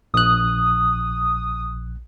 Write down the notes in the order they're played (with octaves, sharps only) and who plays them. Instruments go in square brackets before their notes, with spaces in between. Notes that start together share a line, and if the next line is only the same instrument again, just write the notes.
[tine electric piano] A#1 F#6 [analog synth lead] D#6